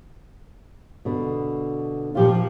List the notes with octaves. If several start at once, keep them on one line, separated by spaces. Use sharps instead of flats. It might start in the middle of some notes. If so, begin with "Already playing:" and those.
B2 D3
A#2 F3 F4 G4